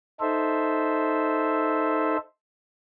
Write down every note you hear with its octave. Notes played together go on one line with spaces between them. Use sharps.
D#4 A4 C5 E5